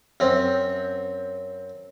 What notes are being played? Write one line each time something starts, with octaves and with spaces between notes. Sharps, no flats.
F#2 C4